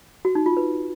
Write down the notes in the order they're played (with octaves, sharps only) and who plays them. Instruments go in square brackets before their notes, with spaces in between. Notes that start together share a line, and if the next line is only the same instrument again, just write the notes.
[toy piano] F#4
D#4
F4
B4